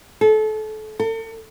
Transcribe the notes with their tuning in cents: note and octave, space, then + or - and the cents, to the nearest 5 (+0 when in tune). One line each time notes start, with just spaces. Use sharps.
A4 -30
A4 +40